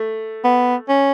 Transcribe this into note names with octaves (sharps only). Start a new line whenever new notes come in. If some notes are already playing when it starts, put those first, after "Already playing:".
Already playing: A3
B3
C#4